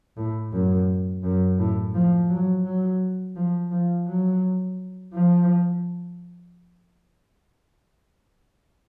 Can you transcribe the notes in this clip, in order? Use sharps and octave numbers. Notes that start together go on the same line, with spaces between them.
A2
F#2
F#2
A2
F3
F#3
F#3
F3
F3
F#3
F3